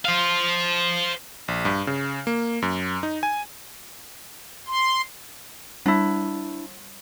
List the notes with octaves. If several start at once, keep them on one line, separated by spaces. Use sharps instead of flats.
C5 F5
A#1
G2
C#3
A#3
F#2
D#4
G#5
C6
G3 D4 E4